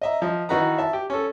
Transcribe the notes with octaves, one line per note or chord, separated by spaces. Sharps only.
D#5 E5 A#5
F3 D#5
D#3 E3 D#4 F#4 B4 A#5
E5 A5
G4
C#4 A4